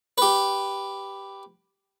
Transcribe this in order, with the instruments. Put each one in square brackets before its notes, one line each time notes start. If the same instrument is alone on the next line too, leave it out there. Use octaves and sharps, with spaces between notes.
[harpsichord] G4 B4